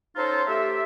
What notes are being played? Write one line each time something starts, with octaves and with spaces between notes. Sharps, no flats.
C#4 D#4 F4 A4 C5
A3 G4 E5